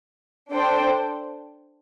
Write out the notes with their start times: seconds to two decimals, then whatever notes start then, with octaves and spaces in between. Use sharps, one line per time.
0.51 D4 A4 C5 G5